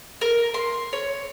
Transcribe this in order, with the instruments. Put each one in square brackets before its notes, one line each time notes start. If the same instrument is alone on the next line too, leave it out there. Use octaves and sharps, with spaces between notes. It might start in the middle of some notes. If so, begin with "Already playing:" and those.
[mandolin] A#4
C6
C#5